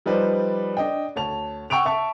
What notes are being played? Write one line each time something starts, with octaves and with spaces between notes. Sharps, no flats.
F3 G3 D#4 B4 C5 D5
D4 D#5 G5
D2 C#5 A5 F7
F#5 G5 C#6 E6 D7 F7
E5 A5 C#6